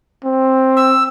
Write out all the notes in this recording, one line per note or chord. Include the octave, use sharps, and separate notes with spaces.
C4
E6